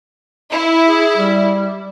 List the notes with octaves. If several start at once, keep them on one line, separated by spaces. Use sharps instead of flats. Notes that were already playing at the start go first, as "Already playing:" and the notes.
E4
G#4
G3